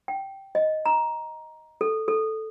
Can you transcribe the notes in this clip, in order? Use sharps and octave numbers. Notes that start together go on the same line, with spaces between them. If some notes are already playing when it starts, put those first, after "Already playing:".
G5
D#5
A#5
A4
A4